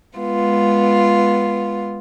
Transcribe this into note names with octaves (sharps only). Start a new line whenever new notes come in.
G#3 B3 F4